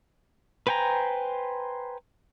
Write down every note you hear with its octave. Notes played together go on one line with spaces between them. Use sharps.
B4 C5 G5 G#5 A#5